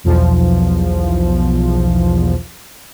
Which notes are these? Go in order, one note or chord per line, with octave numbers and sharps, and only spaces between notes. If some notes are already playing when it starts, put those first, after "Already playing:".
B1 E2 F3